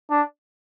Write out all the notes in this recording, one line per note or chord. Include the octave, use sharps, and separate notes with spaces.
D4